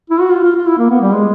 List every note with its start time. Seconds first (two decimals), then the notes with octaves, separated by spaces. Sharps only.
0.10 E4
0.21 F#4
0.32 F4
0.43 F4
0.56 F4
0.67 E4
0.78 A#3
0.90 B3
1.01 G3
1.13 G#3